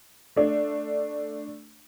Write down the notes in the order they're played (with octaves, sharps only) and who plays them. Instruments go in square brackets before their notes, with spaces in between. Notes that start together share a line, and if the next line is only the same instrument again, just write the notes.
[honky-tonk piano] A3 D4